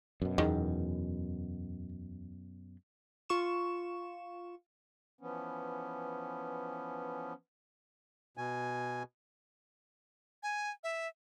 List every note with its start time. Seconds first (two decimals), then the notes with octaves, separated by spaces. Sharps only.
0.22 F#2 B2
0.38 E2 D#3 G#4
3.29 F4 C#6 E7
5.21 E3 F3 B3 C#4
8.37 B2 G#5
10.43 G#5
10.83 E5